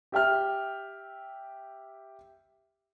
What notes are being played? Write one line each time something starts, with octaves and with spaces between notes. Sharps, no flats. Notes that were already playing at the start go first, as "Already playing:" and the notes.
G4 E5 G5 F6